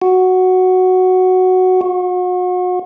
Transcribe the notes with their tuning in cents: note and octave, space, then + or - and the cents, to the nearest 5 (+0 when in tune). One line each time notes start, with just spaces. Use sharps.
F#4 +0
F#4 -35